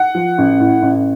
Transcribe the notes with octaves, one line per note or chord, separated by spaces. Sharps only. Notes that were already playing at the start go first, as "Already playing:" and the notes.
Already playing: F#5
F3
A1
A2
A1